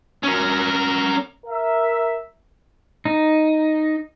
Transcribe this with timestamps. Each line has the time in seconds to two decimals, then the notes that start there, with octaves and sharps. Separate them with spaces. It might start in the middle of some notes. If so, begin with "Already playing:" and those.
0.23 C#4 A#4
1.46 A#4 E5
3.05 D#4